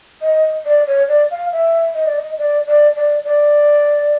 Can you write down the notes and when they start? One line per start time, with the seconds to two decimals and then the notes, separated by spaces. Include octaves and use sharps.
0.22 D#5
0.66 D5
0.87 C#5
1.08 D5
1.31 F5
1.53 E5
1.95 D#5
2.06 D5
2.18 D#5
2.38 D5
2.67 D5
2.96 D5
3.25 D5